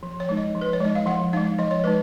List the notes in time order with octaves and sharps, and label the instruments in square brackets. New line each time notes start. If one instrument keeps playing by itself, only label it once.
[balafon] F3
C#5
G#3 D#4
D#5
F3
B4
C#5
G#3 D#4 D#5
F5
F3 F#5
G#3 D#4 F5
F3 D#5
C#5
G#3 D#4 B4